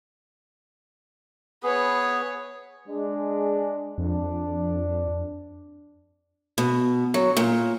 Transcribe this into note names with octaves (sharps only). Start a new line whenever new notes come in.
B3 G#4 B4 C#5
G#3 D4
F2 D4
B2
F#3
A#2